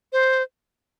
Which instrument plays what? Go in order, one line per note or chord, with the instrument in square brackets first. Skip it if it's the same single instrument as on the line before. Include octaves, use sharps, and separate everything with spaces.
[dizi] C5